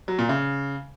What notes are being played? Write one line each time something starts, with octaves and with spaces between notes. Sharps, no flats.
F#3
A#2
C#3